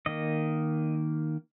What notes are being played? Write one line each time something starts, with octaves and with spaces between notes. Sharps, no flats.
D#3 A#3 D#5